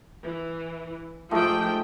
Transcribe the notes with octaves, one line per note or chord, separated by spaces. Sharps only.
E3
G#2 F3 A3 G4 G5